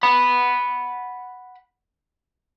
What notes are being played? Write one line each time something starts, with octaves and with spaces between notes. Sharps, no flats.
F#5 B5